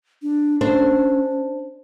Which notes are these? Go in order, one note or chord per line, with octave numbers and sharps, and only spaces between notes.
D4
C#4 D4 C5